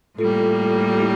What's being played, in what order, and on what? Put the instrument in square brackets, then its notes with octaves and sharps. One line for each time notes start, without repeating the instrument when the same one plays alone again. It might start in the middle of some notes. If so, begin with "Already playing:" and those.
[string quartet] A2 G3 A#3 [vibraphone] F4 A4
[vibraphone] E4 G4